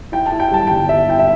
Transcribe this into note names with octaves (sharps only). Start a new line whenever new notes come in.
E4 G5
A5
E4
G5
G3 A5
G1 G5
E4 E5
E4 G5
E5